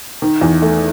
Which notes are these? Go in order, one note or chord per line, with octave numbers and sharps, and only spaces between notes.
D#3
E2
A3